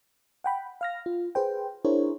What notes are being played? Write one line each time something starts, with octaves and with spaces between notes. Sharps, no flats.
F#5 G5 B5
F5 F6 A#6
F4
G#4 B4 C5 G5
D4 E4 G#4 A#4 C5 C#5